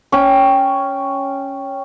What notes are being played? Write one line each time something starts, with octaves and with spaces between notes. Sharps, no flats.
C#4 G5